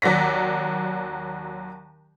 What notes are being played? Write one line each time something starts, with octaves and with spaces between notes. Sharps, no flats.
D#2 F#3 D5 A#6 B6